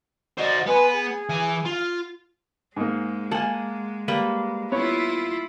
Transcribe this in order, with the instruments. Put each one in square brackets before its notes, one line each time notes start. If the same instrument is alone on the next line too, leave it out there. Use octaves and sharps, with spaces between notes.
[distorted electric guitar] F#4 C5 [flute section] D5 D#5
[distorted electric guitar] B3 [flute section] B4 G#5 C6
[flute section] G#4
[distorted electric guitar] E3 G#5
F4
[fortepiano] G#2 A#3 [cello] G#3
[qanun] A#3 F#5 [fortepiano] G#5 A5
[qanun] G3 A#3 B4
[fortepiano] B3 C#5 [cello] E4 F4